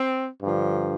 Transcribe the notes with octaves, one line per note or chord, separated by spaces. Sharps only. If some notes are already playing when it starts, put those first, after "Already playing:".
Already playing: C4
G2 D3 F3